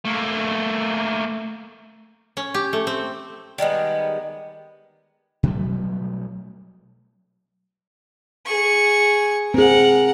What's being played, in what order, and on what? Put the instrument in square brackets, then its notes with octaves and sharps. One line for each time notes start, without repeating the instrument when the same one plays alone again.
[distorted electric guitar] A3 A#3
[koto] C#4
G4
A3
C4
[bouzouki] D#3 G3 G#3 B3
[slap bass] B2 F#3 G3 A3
[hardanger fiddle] G#4 C#6
[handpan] C4 G#4 [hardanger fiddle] A#4 F#5